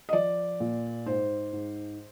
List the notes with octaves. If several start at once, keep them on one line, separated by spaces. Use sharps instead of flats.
D#5
F3 D5
A#2
G#2 C5
G#2